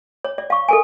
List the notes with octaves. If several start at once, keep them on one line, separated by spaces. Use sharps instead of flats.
C#5
D5
F5 C#6
A4 A#4 G#5